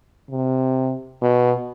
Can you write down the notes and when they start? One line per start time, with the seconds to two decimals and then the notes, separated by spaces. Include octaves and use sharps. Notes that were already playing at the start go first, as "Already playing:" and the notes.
0.30 C3
1.22 B2